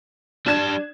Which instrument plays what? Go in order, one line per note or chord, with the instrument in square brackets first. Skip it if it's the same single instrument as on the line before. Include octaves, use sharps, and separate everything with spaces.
[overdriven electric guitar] G3 A5 [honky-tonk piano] D4 G#6 E7